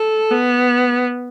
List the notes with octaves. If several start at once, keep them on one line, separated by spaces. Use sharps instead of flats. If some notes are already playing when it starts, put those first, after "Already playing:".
Already playing: A4
B3